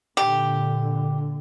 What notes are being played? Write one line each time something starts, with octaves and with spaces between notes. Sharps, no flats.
A#2 D3 G4